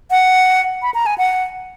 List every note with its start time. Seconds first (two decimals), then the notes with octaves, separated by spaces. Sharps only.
0.11 F#5
0.82 B5
0.94 A#5
1.06 G#5
1.18 F#5